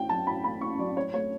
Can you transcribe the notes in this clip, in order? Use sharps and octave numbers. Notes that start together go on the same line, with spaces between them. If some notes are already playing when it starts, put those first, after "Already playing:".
Already playing: A2 A3 G5
F#3 A5
A2 B5
A3 B5
A2 C#6
F#3 D5
A2 C#5
A3 C#5